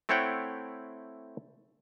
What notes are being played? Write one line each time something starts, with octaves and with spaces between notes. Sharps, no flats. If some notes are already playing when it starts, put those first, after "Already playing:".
A3 C4 E4 C#5 F#5 G5